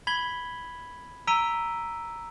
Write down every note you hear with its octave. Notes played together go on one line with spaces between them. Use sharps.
B5 G#6 B6 F#7 G7
A#5 E6 B6 D7 D#7 G7